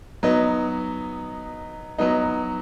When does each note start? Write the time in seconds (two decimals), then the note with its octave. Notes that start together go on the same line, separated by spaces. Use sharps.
0.23 F#3 B3 D#4
1.98 F#3 B3 D#4